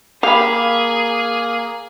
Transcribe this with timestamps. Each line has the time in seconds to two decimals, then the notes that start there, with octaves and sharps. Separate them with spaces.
0.23 A#3 G4 G#4 F5 B5